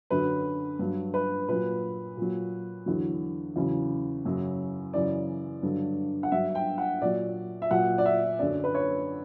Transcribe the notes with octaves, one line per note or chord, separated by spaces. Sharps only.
F#2 D3 F#3 B4
G2 F#3
B4
A#2 F#3 B4
A#2 F#3
E2 D3 F#3
E2 C#3 F#3
F#2 C#3 F#3
F#2 C#3 E3 D5
G2 D3 F#3
F#5
G2 F#3 E5
G5
F#5
A#2 F#3 D5
E5
A#2 F#3 F#5
D5
E5
F#2 D3 F#3 D5
B4
C#5